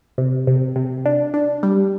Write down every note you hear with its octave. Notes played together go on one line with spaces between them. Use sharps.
C3
C3
C3
D4
D4
G3